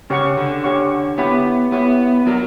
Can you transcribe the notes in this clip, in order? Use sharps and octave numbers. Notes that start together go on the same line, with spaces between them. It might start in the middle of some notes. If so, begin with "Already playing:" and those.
C#3 C#4 G4 C#5 F#5 C#6
D3
C#4 G4 C#5 F#5 C#6
B3 E4 G4 C#5 F#5 B5
B3 E4 G4 C#5 F#5 B5
F#3 D4 F#4 A#4 D5 A#5